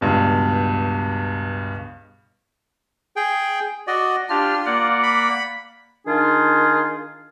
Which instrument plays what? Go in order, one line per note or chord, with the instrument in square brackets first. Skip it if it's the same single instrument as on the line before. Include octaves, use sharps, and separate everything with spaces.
[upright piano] C#2 G2 B2
[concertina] G#4 G5
F#4 D5 D#5
[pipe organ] D4 G4 F6 [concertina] F4
[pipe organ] A#3 D5 F#5
[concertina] B5
[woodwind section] D#3 D4 D#4 F4 G#4